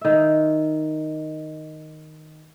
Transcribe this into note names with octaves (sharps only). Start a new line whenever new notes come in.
D#3 E5